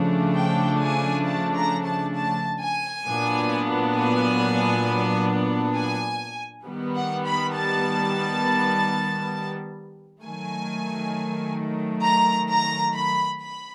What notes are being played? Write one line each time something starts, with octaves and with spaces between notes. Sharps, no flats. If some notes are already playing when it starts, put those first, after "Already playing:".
Already playing: C#3 F3 A3 D4
G5
G#5
A5
A#5
A5
A5
G#5
A#2 F#3 B3 D4
G#5
G#5
D#3 G3 B3
F#5
B5
A5
D#3 F#3 A3 G#5
A#5
A#5
B5
B5